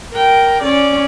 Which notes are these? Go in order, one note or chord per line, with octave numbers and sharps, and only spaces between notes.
A#4 G5
C#4 D5